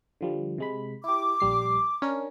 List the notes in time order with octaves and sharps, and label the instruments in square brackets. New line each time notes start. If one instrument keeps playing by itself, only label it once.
[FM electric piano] D3 F3 G3
C3 G#3 B5
[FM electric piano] E4 G4 [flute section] D6
[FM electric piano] A#1 G3 C7
C#4 D4 A#4